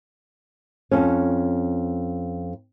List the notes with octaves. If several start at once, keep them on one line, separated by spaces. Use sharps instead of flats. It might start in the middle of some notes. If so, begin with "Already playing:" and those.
F2 C#4